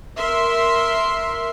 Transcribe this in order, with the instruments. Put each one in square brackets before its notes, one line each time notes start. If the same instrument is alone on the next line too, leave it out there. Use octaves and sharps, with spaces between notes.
[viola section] A#4 E5 C6